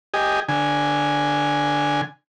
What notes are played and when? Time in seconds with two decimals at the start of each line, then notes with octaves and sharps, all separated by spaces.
0.14 G4 D#5 G#5
0.49 D3 G#5